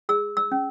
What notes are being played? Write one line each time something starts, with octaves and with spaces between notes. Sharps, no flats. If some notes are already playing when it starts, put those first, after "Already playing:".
G#4 E6
E6
C#4